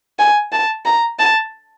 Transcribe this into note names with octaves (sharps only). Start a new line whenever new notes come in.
G#5
A5
A#5
A5